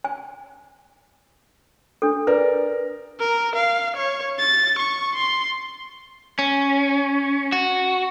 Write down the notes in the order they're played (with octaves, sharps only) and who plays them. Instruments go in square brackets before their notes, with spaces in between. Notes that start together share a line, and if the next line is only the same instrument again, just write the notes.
[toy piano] G#5
D4 A4
[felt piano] A#4 D5 [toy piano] B4
[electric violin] A#4
F5
C#5
A6
C#6
C6
[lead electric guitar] C#4
F#4